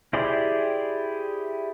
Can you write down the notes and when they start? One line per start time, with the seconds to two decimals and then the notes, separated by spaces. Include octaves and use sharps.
0.13 E4 G4 G#4 C5 D5